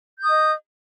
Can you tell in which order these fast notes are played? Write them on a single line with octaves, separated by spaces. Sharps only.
G6 D#6 D#5